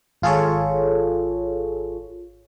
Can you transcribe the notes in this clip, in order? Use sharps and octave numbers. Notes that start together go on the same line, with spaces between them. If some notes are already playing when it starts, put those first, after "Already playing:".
G#1 F4 G#4 A4 C#5